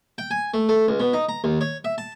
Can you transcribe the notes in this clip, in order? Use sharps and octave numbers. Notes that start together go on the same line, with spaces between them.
G5
G#5
A3
A3
C#2
B2
D#4
A#5
D#2
C#5
E5
A5